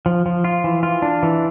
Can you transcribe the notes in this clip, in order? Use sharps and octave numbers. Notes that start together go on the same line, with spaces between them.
F3
F3
F4
E3
F4
D4
E3